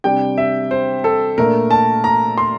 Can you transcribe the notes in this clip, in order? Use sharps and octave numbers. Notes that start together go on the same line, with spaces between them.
C3 G3 D4 G5
E5
C5
A4
A#2 A3 D4 A#4
A5
A#5
C6